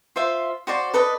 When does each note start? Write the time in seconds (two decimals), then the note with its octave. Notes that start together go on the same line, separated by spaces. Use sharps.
0.16 F4 C5 E5 F5
0.67 F#4 C5 D5 F5
0.94 A4 B4 D5 D#5